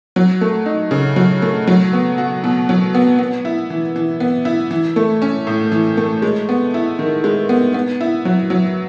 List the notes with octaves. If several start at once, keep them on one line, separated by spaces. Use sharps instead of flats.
F#3
A3
D#4
C#3
F#3
A3
F#3
B3
F#4
B2
F#3
B3
B3
E4
E3
E3
B3
E4
E3
A3
C#4
A2
E3
A3
G#3
B3
E4
D#3
G#3
B3
B3
E4
F#3
F#3